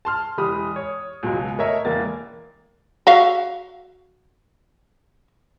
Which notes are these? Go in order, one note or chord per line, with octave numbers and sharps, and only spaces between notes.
A5 C6 F6
E1 G4 B5 D#6
C#5
C#2 B2 F#3 G#3
A3 A#4 C#5 D#5 E5
E1 A#3 A#4 A6
F#4 E5 F5